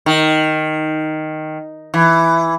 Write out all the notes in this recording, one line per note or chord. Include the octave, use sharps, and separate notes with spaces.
D#3
E3